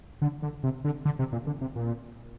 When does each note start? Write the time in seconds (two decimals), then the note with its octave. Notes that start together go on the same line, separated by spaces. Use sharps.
0.22 D3
0.43 D3
0.63 C3
0.84 D3
1.05 D3
1.19 C3
1.33 A#2
1.47 D3
1.61 C3
1.76 A#2